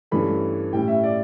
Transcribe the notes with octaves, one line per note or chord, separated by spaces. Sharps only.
G2 E3 A3 C#4 B5
A2 G3 C#4 G5
E5
D5